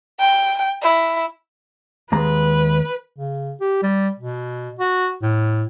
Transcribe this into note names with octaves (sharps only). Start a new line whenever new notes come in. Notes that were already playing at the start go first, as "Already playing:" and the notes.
G5
E4
D#2 G#3 B4 A#5
C#3
G4
G3
B2
F#4
A2